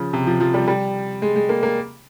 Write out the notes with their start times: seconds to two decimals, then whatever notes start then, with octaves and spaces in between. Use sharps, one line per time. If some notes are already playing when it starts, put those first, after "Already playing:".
Already playing: C#3 F3
0.13 C3
0.27 F3
0.40 F3
0.54 G3
0.68 G3
1.22 G#3
1.36 G#3
1.49 A#3
1.63 A#3